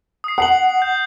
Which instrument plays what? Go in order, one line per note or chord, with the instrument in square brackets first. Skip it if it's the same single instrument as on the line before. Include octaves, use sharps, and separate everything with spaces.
[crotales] D#6 C7
[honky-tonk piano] F#5 [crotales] D#6 C7 F#7
[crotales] G6